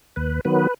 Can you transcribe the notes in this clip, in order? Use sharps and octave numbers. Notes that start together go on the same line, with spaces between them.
D#2 B4
D#3 F#3 B3 B4